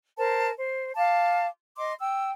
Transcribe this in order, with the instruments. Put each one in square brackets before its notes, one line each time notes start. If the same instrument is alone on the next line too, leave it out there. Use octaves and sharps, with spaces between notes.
[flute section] A#4 C5 A5
C5
F5 A5 D6
D#5 C6 D6
G5 E6